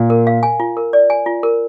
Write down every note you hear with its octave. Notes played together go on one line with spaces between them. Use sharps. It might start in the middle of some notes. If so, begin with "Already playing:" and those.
Already playing: A#2
A#4
F5
G#5
F4
A#4
D5
G#5
F4
A#4